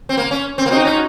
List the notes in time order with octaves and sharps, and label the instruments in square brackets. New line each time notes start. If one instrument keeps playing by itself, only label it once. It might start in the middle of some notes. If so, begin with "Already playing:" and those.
[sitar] C4
A#3
C#4
C4
A#3
[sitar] C4 [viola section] D#4 F#4
[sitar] C#4